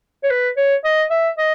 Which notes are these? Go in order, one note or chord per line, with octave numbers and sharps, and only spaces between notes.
C#5
B4
C#5
D#5
E5
D#5